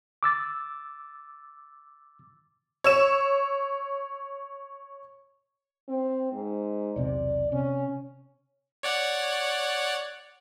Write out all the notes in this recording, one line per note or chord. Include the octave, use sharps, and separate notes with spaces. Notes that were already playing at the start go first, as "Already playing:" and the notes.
D6 E6 A6
C#5 E6 E7
C4
G#2
B1 E2 C3 D5
C3 C#4
C#5 D5 F#5